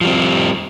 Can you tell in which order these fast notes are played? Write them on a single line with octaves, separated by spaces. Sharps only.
F3 G3 C4